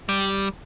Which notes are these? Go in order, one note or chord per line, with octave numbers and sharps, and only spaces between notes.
G3